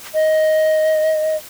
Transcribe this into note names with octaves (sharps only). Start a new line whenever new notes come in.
D#5